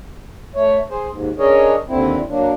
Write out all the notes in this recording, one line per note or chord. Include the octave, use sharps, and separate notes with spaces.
A3 C#5
G#4 C5
D#2 G#2
C#4 D4 G#4 A#4 C#5 D#5
D#2 D3 C4 E4
F#3 A#3 D4